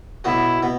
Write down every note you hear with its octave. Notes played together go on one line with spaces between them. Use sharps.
B1 B2 B3 E4 F#4
B2 B3